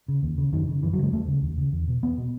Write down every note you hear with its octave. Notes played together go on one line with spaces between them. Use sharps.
C#3
D#2
C#3
F#2 D#3
C#3
F#2 E3
F#3
C#3
G#3
D#2 A3
C#3
D#2
C#3
E2
B2
E2 B3
B2